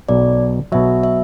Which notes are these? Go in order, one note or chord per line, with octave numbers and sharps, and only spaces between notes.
B1 B2 F#3 D5
B1 B2 F#3 E5
E5